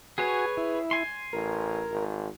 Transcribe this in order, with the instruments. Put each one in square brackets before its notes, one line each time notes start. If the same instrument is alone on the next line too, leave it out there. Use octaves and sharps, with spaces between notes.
[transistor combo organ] F#4 G#5 [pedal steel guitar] G#4 B4 C#5
[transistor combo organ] E4
[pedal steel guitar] G#5 C6
[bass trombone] A1 [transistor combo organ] A#4
[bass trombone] G#1